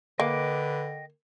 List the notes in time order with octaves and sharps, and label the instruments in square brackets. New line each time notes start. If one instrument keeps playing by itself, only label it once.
[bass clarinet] D3 [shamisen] A#3 [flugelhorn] B4 [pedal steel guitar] D#5 G5 D6